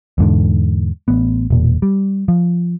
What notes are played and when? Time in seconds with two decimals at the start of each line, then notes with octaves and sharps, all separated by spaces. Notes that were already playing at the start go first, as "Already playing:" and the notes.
0.18 E2 G#2 D3
1.08 A1 B3
1.50 E1 A#2
1.82 G3
2.28 F3